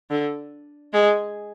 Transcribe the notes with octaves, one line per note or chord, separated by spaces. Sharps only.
D3
G#3